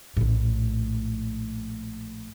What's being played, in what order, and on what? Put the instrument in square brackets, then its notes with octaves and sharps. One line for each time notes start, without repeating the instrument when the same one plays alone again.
[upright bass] A#1 A2